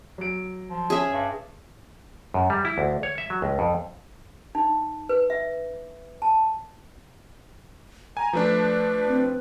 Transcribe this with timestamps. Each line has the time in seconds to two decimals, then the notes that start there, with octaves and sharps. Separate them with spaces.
0.18 F#3 D7
0.70 F3
0.90 C#4 G#4 E5
1.09 G2
2.34 F#2
2.50 G3
2.65 E4
2.78 D2
3.03 C#5
3.18 E5
3.30 F#3
3.42 C#2
3.59 F2
4.55 D#4
5.09 B4
5.30 E5
6.22 A5
8.17 G#5 A#5
8.33 F3 A3 D4 B4
9.08 C4